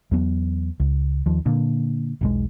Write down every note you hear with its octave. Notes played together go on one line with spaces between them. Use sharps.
E2 F#3 B3
C#2
D#2 F3
A#2 D3
E1 B1 G#3